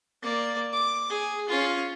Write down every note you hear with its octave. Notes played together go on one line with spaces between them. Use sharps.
A#3 D5
D6
G#4
C#4 F4